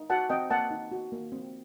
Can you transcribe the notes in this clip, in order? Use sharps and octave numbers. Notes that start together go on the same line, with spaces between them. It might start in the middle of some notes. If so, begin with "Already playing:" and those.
Already playing: D#4
F#4 F#5 A5
C4 D#5 G5
A#3 F#5 A5
D#4
F#4
A#3
C4